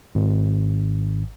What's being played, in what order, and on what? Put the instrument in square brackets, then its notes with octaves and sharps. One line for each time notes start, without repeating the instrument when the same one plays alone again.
[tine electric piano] G#1